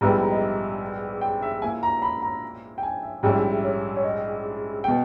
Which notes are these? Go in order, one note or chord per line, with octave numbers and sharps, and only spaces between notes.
A#1 G#2 G3 B3 E4 A#5
B5
A#5
D#5
E5
G5
E5
A#2 A#3 E4 G#5
A#5
B5
A#5
G5
G#5
E5
A#1 G#2 G3 C#4 E4 G5
E5
E5
C#5
C#5
D#5
B2 G5